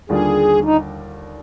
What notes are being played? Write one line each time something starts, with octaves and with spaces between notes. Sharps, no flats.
D#2 D3 G3 D4 F4 G#4
D#4